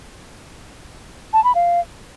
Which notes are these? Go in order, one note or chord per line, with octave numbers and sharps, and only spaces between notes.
A5
B5
F5